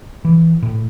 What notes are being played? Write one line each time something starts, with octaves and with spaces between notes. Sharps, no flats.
E3
A2